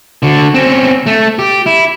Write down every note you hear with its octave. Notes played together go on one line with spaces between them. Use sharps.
D3 F#4
C4 C#4
A3
G4
E4